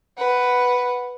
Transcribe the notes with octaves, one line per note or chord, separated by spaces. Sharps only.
B4 F#5